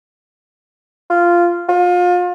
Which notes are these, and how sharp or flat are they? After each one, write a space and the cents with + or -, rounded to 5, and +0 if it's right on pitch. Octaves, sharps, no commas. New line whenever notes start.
F4 -10
F4 +30